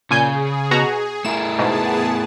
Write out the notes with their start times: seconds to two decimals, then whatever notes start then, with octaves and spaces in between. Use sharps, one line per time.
0.11 A#2 C#3 G#4 G#5 G6
0.71 B2 F#4 A#5
1.25 A3 E4 A#4 A5 E7
1.59 G#2 B2 B3 G#4 A5